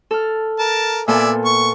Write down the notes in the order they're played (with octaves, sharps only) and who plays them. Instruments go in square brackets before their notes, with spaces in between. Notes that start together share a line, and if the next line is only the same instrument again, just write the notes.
[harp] A4 F6
[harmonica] A#4 A5
[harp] A#2 B3 A4 [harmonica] D5 E5 G#5
[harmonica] C#6